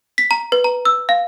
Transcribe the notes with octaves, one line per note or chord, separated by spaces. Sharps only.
B6
A#5
B4
A#5
E6
F5